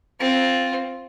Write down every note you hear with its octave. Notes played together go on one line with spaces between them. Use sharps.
C4 F4